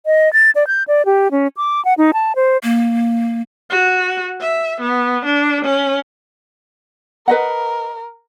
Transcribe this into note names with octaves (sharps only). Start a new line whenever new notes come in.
D#5
A6
D5
G6
D5
G4
C#4
D6
F#5
D#4
A5
C5
A#3
F#4
E5
B3
D4
C#4
A#4 B4 D#5 F#5